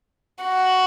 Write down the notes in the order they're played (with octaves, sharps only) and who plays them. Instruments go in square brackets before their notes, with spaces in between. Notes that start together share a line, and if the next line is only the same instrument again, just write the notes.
[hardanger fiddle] F#4